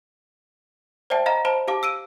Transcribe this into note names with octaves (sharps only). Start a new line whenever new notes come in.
C5 D5 E5 G5 A5
D#5 F5 A#5 B5
C5 A5 B5
G4 F5 A5 D6
E6 D7 D#7